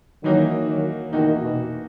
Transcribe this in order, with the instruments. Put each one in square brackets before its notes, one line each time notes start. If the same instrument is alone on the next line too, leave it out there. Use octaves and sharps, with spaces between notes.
[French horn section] D#3 F#3 [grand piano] E3 A#3 D#4 F#4
[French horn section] D#3 F#3
[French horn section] B2 D#3 [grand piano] E3 A#3 D#4 F#4
[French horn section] B2